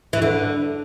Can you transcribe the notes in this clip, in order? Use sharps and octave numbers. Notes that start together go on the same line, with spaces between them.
E3
D3